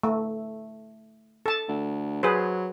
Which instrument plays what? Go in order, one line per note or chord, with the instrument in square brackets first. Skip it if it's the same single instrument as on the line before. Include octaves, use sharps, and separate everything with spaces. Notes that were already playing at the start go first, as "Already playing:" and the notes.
[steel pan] A3
A4 A5
[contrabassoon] D2
[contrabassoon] F#3 [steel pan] G#4 B4 C5